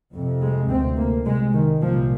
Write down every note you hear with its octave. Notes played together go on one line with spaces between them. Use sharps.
F2 C3
G#3
D2 C3 C4
A#3
C2 C3 G#3
D#3
C2 A#2 F3